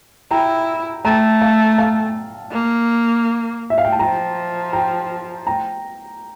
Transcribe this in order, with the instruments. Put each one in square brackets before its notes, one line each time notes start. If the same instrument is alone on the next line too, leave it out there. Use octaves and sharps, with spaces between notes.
[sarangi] E4 [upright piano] G5 A#5
[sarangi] A3 [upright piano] G5 A#5
[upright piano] F5 A5
F5 A5
[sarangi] A#3
[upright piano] E5
F5
G5
A5
[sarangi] F3 [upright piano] G5 A#5
[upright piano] G5 A#5
G5 A#5